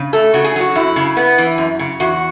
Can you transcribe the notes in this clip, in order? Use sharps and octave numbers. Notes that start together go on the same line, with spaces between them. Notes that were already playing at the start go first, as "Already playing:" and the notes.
Already playing: C#3
A3 A4
C#3 F#4
G#4
F#3
F#4
F#2 E4
C#3
B3
E3
F#2
C#3
E2 F#4